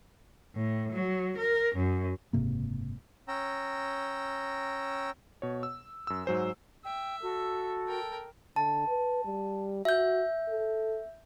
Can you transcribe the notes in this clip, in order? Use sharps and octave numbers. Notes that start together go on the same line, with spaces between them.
A2
F#3
A#4
F#2
F#1 G#2 C3 A#3
C#4 G5 A#5 E6
B2 C#5
E6
F#2 E6
G#2 F#3 C5 G#5
E5 G5
F#4 A4
A#4 G5
D3 A5
B4
G3
F#4 E5 G6
A4